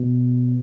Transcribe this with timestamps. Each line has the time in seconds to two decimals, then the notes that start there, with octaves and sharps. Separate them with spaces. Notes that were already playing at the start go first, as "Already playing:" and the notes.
Already playing: B2